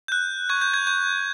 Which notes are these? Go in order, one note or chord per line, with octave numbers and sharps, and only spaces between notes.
F#6 G6
C#6 G#6
G6
G#6
C#6 G6